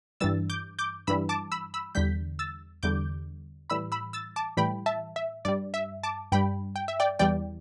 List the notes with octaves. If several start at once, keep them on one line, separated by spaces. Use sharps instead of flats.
G2 E3 G3 E6 A6
D6 G6
D6 G6
G2 E3 G3 B5 E6
A5 D6
B5 E6
B5 E6
E2 D3 G3 G6 B6
E6 A6
E2 D3 G3 D6 G6
A2 E3 G3 B5 E6
B5 E6
E6 A6
A5 D6
A2 E3 G3 G5 B5
E5 A5
E5
G2 G3 D5
E5
A5 D6
G2 G3 G5 B5
G5
E5
D5 G5
E2 E3 G3 D5 G5